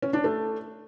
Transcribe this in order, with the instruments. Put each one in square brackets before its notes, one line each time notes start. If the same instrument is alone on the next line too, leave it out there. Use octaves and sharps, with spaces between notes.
[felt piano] C#4
D4
A3